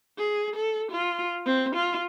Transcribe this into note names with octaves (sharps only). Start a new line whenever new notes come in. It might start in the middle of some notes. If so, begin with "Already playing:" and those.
G#4
A4
F4
C4
F4